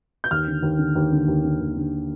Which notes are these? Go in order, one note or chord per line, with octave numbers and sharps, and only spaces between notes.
G6
D#2 F6
D3
D#2
D3
D#2
D3
D#2
D3
D#2
D3